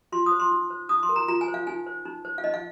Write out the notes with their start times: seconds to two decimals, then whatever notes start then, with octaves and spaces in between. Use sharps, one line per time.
0.12 F4 C6
0.26 D#6
0.32 C5
0.40 C6
0.51 D#4
0.70 C5
0.89 D#4 D#6
1.03 C6
1.09 A#4
1.16 A#5
1.28 F4 A#5
1.41 G#5
1.48 C5
1.54 F5
1.67 D#4 G#5
1.87 C5
2.05 D#4
2.25 C5
2.38 F5
2.44 D#4 D#5
2.54 F5